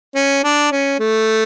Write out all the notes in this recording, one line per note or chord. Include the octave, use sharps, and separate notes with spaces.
C#4
D4
C#4
A3